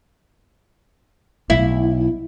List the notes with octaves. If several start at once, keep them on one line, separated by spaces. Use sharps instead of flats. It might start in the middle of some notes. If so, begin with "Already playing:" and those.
B1 E4